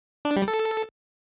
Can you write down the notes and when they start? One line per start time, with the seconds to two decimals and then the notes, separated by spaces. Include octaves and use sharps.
0.25 D4
0.36 G3
0.48 A4